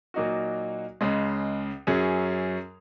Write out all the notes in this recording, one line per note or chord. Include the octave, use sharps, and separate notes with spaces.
A#2 F#3 A#3 D#4 F#4
C#2 C#3 G#3
F#2 F#3 C#4 G#4